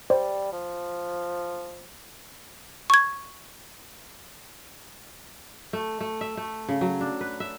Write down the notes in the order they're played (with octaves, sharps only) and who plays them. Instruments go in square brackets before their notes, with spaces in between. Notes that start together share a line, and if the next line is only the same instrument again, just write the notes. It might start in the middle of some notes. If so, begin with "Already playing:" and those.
[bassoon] G3 [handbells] C5 D5
[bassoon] F3
[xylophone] C#6 G#6
[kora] A3
A3
E5
A3
C#3
F#3
D4
B4
E5